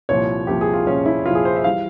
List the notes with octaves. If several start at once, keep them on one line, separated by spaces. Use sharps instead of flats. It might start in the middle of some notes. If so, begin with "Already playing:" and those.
C2 A#2 F3 C#5
C2 A#2 F3 G4
G#4
F4
C2 A#2 F3 C#4
E4
C2 A#2 F3 F4
G#4
C5
E5
E3 G3 F5